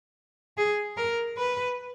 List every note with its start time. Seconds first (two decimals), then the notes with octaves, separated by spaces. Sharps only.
0.57 G#4
0.97 A#4
1.37 B4